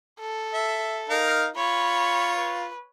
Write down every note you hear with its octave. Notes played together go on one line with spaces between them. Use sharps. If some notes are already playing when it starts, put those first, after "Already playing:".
A4
E5
D#4 A#4 F5
F4 C#5 B5
B4